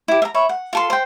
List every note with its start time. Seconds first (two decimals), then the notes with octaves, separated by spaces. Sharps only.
0.08 E4 G4
0.22 E5 A#5
0.34 C#5 E5 B5
0.49 F#5
0.73 F4 A4 C6
0.90 C5 G5